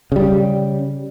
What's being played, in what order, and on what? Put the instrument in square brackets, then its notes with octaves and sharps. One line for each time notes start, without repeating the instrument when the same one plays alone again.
[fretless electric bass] C#3 G3